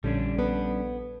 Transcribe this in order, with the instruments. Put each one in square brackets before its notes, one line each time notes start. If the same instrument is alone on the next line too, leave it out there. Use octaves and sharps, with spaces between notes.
[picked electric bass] A#1 [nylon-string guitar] D3 [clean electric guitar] G3 C#4 D4
[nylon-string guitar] B3 A4 B4